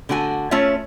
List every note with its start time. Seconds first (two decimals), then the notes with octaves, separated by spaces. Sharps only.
0.09 D3 A3 F#4 G#5
0.51 A3 C#4 F4 C#5 E5